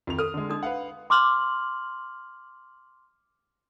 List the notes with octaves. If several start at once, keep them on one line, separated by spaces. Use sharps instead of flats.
F2 D#3 F7
A4 D#6 F6
D3 G#3
D4 D#4 D#6
B4 F5 F#5
C6 D6 F6 F#7